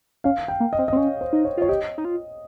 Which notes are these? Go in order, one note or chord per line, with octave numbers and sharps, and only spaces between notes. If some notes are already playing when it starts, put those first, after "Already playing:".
C#4 F5
G5
A#3
D#5
C4
D#5
C4
C#4 C#5
C5
D#4
C#5
F4 C#5
G4 D#5
D#4
F4